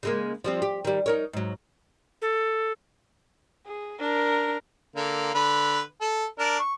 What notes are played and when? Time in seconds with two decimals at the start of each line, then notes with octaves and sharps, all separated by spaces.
0.03 C#3 G#3 A#3
0.44 F3 G3 C4
0.62 G4
0.85 D#3 G3
1.06 D#4 A#4 C#5
1.33 G#2 F#3
2.22 A4
3.66 G#4
4.00 D4 A#4
4.96 D3 A#3
5.34 D3 B4
6.01 A4
6.39 D4 A#4
6.59 C#6